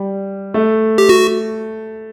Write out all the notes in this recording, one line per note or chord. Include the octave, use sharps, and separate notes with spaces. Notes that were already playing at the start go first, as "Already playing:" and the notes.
Already playing: G3
A3
G4
F#4